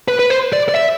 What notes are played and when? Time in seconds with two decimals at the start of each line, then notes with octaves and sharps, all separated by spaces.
0.08 B4
0.19 B4
0.30 C5
0.53 D5
0.69 D5
0.75 E5